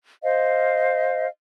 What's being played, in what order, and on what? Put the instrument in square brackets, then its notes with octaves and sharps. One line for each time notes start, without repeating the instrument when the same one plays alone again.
[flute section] C5 D#5 F5